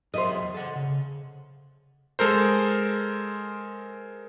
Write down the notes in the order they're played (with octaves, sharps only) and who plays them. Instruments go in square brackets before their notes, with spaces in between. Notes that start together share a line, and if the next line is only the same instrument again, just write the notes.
[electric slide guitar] E2 F#3 E5 [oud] C5 D#5
[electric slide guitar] A4 F#5
C#3
[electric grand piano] G#3 A4 A#4 C5